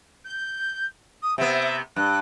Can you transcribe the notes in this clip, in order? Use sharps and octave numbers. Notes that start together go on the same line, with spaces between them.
G6
D#6
C3 B3 E5
G2 F#6